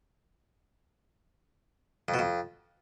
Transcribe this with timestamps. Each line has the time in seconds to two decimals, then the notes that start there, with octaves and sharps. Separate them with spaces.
2.08 F2
2.14 B2
2.19 F2